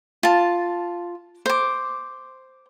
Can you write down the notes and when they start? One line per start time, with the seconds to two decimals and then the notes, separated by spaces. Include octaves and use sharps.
0.23 F4 A5
1.46 C5 D6